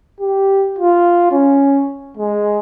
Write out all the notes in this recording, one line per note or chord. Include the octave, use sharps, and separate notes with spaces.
G4
F4
C#4
G#3